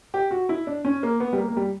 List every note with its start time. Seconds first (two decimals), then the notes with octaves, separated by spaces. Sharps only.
0.14 G4
0.31 F#4
0.49 E4
0.67 D4
0.85 C#4
1.03 A#3
1.20 B3
1.33 G3
1.38 A#3
1.48 A#3
1.57 G3